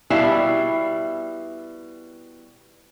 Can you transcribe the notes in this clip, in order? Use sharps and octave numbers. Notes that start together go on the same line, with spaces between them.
B2 G3 E4 E5 F5 A5